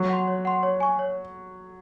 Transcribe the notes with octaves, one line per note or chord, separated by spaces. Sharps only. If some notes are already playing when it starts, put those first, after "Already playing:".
Already playing: F#3
F#5 C6
C#5
F#5 C6
C#5
G#5 C#6
C#5